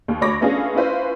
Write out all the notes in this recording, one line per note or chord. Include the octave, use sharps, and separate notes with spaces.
D#2
D2 C#5 B5 D6 A#6
A3 B3 C#4 D4 F4 G#4
C#4 E4 F4 B4 C5